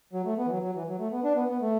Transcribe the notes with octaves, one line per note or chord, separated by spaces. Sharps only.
F#3
A3
B3
E3
F#3
F#3
E3
F#3
A3
B3
D4
B3
B3
A3